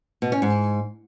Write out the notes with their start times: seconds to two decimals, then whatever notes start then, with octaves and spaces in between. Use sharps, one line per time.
0.22 B2
0.32 C#4
0.42 G#2